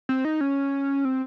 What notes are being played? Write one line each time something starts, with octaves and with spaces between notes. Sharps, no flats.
C4
D#4
C#4
C4